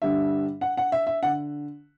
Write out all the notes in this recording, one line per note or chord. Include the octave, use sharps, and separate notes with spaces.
G2 D3 G3 E5
F#5
F#5
E5
E5
D3 F#5